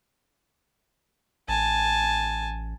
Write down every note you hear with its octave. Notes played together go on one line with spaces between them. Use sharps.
A1 G#5 A5